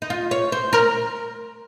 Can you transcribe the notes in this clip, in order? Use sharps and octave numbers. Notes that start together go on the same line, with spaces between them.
D#4
F4
C#5
C5
A#4